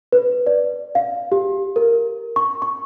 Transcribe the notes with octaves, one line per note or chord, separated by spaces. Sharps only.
B4
D5
F5
G4
A#4
C#6
C#6